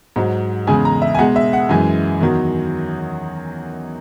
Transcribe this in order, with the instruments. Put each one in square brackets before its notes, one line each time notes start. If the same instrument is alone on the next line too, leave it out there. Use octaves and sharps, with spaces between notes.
[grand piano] G#2 F#3
E2 C#3 G#3 G#5
A#5
E5
G#5
B2 G#3 F#5
E5
F#5
F#2 E3 G#3 G#5
E2 D#3 F#3